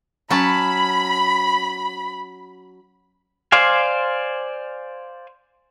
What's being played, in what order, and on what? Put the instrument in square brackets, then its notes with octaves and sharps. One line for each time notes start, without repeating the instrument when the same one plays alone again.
[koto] F#3 C#4 A5 [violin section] B5
[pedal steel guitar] C5 D5 F5 G#5